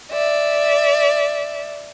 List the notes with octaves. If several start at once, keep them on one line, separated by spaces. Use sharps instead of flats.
D5 E5